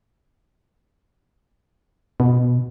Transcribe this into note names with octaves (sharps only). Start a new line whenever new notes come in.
B2